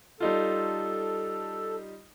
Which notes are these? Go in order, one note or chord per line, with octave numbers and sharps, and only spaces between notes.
G3 D#4 F4 A4